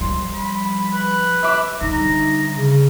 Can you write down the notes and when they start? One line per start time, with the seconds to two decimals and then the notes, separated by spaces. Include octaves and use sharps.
0.01 F3 G3 C6
0.34 B5
0.93 B4
1.43 E5 D6
1.81 D3 G3 D#4 A#5
2.55 C#3